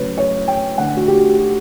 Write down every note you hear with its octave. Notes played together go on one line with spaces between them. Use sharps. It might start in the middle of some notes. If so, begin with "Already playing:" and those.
Already playing: C#3 F#3 A3 B4 C#5
C#5
G5
D3 A3 F#5
F#4
G4
F#4